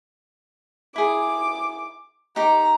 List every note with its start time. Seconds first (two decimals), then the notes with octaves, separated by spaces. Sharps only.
0.96 E4 G#4 D6
2.36 D#4 G4 A#5 D6